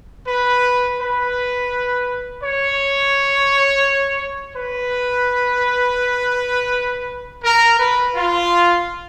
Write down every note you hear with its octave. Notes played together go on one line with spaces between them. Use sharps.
B4
B4
C#5
B4
A#4
B4
F4